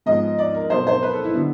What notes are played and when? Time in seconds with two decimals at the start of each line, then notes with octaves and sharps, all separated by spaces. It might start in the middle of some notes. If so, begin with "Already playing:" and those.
0.06 G#2 F3 G#3 B3 D#5
0.39 D5
0.54 A#4
0.70 B2 F#3 A3 C5
0.87 C5
1.03 B4
1.13 A4
1.24 E4
1.34 D3 F#3 B3